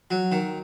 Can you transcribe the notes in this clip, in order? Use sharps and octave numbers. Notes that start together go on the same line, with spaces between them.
F#3
D#3